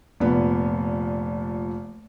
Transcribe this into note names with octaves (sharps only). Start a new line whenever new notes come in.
F1 A#2 B3